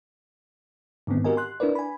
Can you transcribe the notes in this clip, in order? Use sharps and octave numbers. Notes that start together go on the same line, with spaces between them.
G#2 D3 D#3 B3 C4
F#4 G4 A#4 D#5 G#5
C6 F#6
D4 E4 A#4 B4 D5
G#5 B5